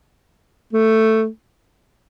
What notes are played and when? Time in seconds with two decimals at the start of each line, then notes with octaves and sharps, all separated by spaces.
0.73 A3